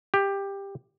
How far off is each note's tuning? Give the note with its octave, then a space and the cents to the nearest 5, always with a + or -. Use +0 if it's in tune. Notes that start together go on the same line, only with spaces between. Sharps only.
G4 +15